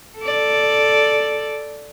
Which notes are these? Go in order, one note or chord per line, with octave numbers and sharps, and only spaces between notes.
A4 D5